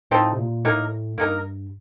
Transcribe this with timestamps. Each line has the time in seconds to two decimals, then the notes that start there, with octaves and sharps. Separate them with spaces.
0.11 A2 F3 C4 D#4
0.33 C3
0.38 A#2
0.65 A2 A#3 D#4 A#4
1.18 G2 A#3 D#4 A#4